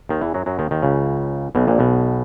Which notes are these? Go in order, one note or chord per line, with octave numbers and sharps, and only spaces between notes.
D#2 D#3
E2 E3
F#2 F#3
F#2 F#3
D#2 D#3
D#2 D#3
C#2 C#3
B1 B2
A#1 A#2
B1 B2